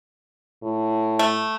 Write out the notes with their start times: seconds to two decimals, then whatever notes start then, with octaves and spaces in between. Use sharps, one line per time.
0.64 A2
1.19 A3